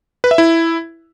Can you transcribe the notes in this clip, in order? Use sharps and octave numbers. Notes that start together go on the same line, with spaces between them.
B4
E5
E4